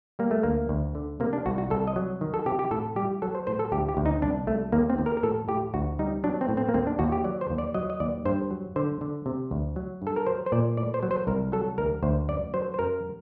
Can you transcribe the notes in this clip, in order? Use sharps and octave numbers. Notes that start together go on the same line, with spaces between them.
G3 A#3
A3
D2 A#3
D2
D3
C3 A#3
D4
C2 F#4
F#4
C2 A4
D#5
F#3
D#3
A4
C3 G4
G4
A2 A4
G3 G4
F#3 A4
C5
A2 C5
A4
D2 G4
G4
D2
D#4
C2 D4
C2 A3
D#2 A#3
C4
D#2
A#4
A#4
A2 A4
A2 G4
D2 F#4
G3 D#4
F#3 D4
C4
A2
C4
A#3
D#2 C4
D4
D#2 F#4
G4
F#3 D5
C5
D#2
D5
F#3 D#5
D#5
D#2 D5
G2 C5
F#3
D3 C5
D3
C3
D2
F#3
G2
A4
A#4
F#3 C5
C5
A#2 D5
A2 D5
C5
F#3
C5
C2 A#4
F#3 A4
D2 A#4
D2 C5
F#2 D5
F#3 C5
C5
F#2 A#4